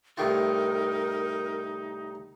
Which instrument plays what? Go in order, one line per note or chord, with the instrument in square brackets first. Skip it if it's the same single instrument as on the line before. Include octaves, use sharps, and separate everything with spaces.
[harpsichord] C2 A2 F4 [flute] D#4 [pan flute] A#4